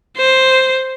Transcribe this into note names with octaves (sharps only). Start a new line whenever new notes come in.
C5